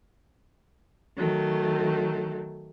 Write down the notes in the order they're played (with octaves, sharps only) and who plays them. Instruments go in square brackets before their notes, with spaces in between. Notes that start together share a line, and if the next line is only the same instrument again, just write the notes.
[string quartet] D#3 F#3 A3